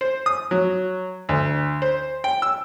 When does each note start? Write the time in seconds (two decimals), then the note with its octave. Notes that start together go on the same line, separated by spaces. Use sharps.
0.01 C5
0.26 D#6
0.51 F#3
1.29 D2
1.82 C5
2.24 G5
2.42 E6